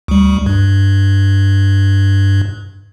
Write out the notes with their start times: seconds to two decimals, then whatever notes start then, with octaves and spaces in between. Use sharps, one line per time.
0.08 D2 G3
0.46 G2